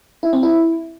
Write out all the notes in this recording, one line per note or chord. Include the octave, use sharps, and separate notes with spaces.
E4
C4
E4